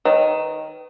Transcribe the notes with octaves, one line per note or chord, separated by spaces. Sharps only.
D#3 B4 C#5